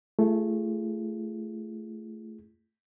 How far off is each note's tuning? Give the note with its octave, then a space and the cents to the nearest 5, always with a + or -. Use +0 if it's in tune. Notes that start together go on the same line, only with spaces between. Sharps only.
A3 +0 F4 -45 G#4 -10